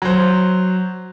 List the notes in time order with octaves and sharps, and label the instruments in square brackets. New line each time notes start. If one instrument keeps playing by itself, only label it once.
[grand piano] F#3 C5